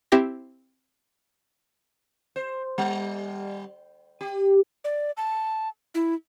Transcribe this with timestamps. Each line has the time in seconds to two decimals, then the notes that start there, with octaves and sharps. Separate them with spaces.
0.12 C4 E4 G4 A#6
2.36 C5
2.78 G3
4.21 G4
4.84 D5
5.17 A5
5.95 E4